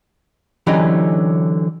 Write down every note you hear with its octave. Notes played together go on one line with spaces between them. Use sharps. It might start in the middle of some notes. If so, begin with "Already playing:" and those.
D3 E3 F#3 C#4 D#4 G4